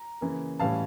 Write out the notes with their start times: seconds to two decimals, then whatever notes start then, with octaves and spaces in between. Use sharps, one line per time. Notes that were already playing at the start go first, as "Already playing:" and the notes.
Already playing: A#5
0.21 C#3 E3 A#3
0.60 A2 E3 G3 C#4 F5 A5